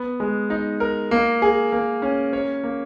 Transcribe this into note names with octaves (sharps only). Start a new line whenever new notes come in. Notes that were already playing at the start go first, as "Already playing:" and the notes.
Already playing: B3
G#3
D#4
A#4
A#3
G#4
A#3
C#4
C#5
A#3